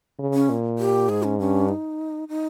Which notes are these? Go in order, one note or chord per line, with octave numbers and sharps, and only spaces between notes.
C#3
C#4
A#2
G4
G#2 G#4
C#4
G2 C#4
D#4
D#4